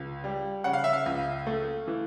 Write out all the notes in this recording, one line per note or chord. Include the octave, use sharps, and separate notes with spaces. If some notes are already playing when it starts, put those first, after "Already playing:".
Already playing: C#2
G3
C#3 F#5
F5
E5
F5
C#2
A3
E3